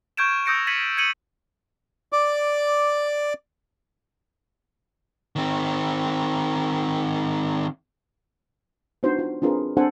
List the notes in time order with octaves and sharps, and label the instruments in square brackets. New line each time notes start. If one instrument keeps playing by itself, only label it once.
[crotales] C#6 F6 G6 G#6 D7 E7
D#6 E6 G6 A#6 C#7 D7
G#6 A6 B6 C#7 D#7 F#7
G#6 C#7 D#7 F#7
[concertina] D5 D6
[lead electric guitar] D#3 C4
[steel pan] B3 D4 D#4 F#4 C5
F4
C4 D4 F4 G#4 A#4 B4
C4 D4 A4 C5 F#5 G#5